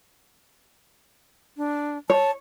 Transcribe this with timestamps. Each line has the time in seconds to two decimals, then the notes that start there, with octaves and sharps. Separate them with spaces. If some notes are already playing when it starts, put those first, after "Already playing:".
1.57 D4
2.10 C#5 A5